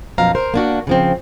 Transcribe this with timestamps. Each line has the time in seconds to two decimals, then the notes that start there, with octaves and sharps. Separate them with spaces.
0.18 F#2 B2 F3 F5 A#5
0.35 A#4 C5
0.54 A#3 D4 F#4
0.87 C#3 F3 C4